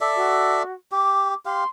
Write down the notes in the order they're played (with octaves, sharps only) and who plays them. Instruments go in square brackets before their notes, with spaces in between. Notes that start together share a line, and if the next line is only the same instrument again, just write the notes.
[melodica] A4 D5 E5
[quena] F#4
[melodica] G4 [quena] D6
[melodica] G4 F5 [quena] C6